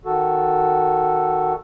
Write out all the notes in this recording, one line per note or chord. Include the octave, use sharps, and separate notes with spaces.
D#3 F#4 A4